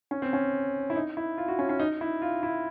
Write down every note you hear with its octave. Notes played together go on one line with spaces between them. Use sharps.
C#4
C4
C#4
E4
D#4
E4
F4
F#4
C#4
C#4
D#4
E4
F4
E4